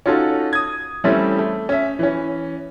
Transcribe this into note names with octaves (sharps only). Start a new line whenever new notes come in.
C#4 D#4 F4 F#4 A4
D#6 G#6
E3 G3 A3 C4 C#4 E4
A3
C#4 E5
E3 C#4